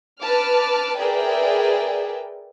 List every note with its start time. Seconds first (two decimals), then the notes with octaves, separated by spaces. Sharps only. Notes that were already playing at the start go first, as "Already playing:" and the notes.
0.22 B4 A5 D6 F6
0.98 G#4 A#4 B4 D5 E5 G5